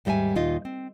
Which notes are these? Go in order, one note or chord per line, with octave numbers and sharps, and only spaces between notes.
D#2 G#2 G3 D#5 E5 G#5
D#2 A#2 D#4 F4 D#5
C4